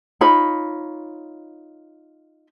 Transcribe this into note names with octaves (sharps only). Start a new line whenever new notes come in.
D#4 F4 C#5 B5